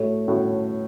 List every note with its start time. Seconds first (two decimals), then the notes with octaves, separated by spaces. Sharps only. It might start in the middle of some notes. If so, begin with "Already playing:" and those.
Already playing: A2 A3 F#4 A4 C#5
0.28 A2 A3 F#4 A4 C#5